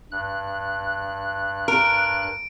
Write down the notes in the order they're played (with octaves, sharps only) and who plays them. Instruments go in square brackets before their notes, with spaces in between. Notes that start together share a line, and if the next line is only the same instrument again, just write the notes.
[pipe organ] G2 F#6
[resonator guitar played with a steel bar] A#4 [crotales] D7